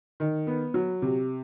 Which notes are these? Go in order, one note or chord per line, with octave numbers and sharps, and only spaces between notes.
D#3
B3
F#3
C3